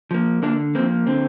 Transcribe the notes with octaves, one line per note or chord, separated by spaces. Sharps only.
F3 A#3
D3 A#3 D4
F3 A#3 C4
D3 C4